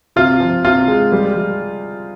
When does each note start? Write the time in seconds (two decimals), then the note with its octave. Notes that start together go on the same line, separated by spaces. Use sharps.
0.16 C3 F4
0.40 F3
0.64 C3 F4
0.88 G#3
1.12 G3
1.36 G3